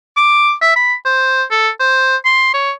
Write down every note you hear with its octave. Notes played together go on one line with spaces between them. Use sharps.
D6
E5
B5
C5
A4
C5
C6
C#5